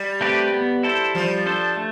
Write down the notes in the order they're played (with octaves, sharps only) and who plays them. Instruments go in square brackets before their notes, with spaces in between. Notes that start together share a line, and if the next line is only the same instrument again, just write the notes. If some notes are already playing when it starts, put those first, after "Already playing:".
Already playing: [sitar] G3
[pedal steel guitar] A3 C4 G4 B4
B3
E4 A4 C5
[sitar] F3 [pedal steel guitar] G3
[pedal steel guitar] D4 A4 C5
A3